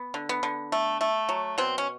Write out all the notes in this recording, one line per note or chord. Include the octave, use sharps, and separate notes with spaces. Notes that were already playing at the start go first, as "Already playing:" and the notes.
Already playing: B3
D3
B3
D3
A3
A3
F#3
B2 C4
C#4